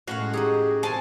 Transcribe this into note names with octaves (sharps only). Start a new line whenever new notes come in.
A2 C#4 F#4 F5
G#3
F#3 D#4 G4 G#4 D#5
C4 C#4 G#5 A5